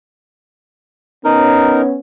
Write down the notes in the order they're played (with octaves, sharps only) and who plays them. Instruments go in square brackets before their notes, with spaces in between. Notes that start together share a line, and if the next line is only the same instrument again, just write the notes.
[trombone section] B3 C#4 [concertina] D#4 A#4